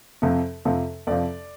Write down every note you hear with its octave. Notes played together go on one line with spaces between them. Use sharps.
F2 C3 F3
F2 C3 F3
F2 C3 F3 D5